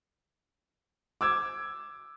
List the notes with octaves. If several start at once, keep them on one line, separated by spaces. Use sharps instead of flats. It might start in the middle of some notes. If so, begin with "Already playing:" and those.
D6 E6 G#6